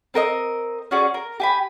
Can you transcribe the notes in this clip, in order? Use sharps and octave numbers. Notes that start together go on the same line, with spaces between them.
C4 A#4 B4 D#5
C#4 F#4 G#4 D5
A#4
G4 G#5 B5